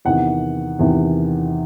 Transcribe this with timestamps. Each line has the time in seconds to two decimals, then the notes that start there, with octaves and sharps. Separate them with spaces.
0.05 E2 C3 D#3 F#5
0.79 E2 C3 D#3